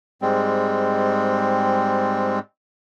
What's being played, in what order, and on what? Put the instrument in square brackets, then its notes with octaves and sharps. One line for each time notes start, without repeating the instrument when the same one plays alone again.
[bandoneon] G#2 G3 G#3 C4